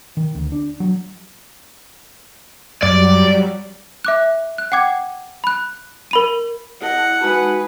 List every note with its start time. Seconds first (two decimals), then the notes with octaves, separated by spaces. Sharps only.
0.17 D#3
0.35 D2
0.52 D4
0.80 F#3
2.83 F#2 F#3 G3 D5
4.05 E5 D6 F#6
4.58 F#6
4.72 F#5 G5 D6 G#6
5.44 B5 F#6
6.11 A#4 B5 D#7
6.82 E4 G#4 A#4 D#5 F#5 A5
7.21 G#3 D#4 F#4 G#4 B4 A5